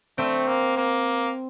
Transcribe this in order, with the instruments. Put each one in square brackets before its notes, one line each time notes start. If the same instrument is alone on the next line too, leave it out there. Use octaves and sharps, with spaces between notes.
[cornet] A3 [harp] C4
[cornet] A#3
A#3